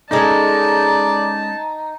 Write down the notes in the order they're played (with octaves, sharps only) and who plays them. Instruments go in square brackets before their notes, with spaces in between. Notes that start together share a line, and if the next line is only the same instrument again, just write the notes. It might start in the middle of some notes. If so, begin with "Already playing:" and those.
[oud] G#3 C#4 A4 [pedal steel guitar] D#4 [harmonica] D5 [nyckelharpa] A5